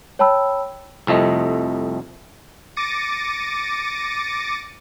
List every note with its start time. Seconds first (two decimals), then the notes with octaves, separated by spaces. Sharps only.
0.19 C#5 G5 A5 B5 E6
1.07 C2 F2 A3 D#5
2.76 D6 A6 A#6 C#7 D#7